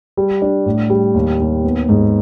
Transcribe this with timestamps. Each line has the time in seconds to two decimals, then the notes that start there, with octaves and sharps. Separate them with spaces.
0.17 G3
0.42 D4
0.66 A2
0.90 G3
1.14 D#2
1.40 D#2
1.65 B3
1.89 G#2